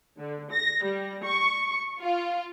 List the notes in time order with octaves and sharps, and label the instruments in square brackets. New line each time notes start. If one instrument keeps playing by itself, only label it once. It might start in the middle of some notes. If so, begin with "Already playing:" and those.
[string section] D3
A#6
G3
C#6
F4